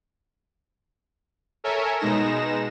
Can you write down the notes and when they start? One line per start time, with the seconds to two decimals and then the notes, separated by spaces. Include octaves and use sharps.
1.64 A4 A#4 C#5 E5 G#5
1.99 B2 G#3 D#4 A#6 E7